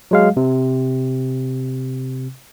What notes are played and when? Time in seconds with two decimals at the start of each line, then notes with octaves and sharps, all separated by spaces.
0.11 F#3 G#3 F5
0.37 C3